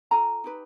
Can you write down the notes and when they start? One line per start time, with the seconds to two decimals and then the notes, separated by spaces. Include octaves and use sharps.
0.11 F4 A4 G#5 A#5
0.44 D#4 G4 B4